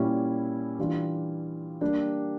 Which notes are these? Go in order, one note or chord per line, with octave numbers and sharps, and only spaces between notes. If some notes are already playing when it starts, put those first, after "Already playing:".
Already playing: A#2 G3 C#4 E4
E3 G3 D4 F4
G3 A#3 D4 G4